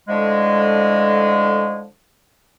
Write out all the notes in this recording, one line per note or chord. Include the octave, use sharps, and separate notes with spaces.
A2 D3 F3 G#3